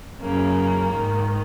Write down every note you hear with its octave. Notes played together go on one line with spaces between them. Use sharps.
F#2 C#3 A#3
G#2 D#3